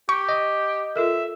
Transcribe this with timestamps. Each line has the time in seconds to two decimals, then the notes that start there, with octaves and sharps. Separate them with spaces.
0.09 G4 C#6
0.29 D#5
0.96 F4 A4 A#4 E5